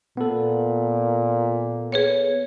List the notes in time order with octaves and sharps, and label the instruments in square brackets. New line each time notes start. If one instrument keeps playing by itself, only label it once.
[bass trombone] A#2 [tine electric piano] B3 A4
[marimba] G#4 B4 C#5